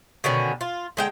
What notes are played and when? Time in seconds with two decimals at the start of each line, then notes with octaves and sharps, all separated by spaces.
0.24 B2 D3 D#3 C#4
0.61 F4
0.97 D3 G#3 G5